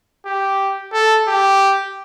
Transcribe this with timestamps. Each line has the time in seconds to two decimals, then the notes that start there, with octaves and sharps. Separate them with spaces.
0.26 G4
0.93 A4
1.28 G4